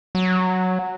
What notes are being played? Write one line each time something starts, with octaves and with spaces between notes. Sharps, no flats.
F#3